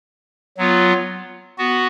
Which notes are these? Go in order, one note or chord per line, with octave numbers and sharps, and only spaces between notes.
F#3 B3 F4
B3 F#4